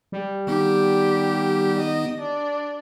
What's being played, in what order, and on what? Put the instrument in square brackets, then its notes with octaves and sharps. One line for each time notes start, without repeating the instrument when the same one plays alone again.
[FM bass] G3
[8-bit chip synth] D#3 B3 D#4 [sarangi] G4
[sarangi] D#5
D4